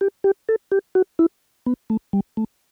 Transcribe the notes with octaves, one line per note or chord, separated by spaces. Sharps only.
G4
G4
A4
G4
F#4
E4
B3
A3
G3
A3